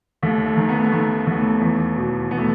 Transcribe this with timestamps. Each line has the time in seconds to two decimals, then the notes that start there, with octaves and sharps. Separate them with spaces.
0.23 D#2 A3
0.46 A3
0.57 D#3
0.69 B3
0.77 A3
0.84 B3
0.92 D#3 A3
1.27 D#2 B3
1.39 A3
1.61 E2
1.96 B2
2.30 B2 B3
2.38 A3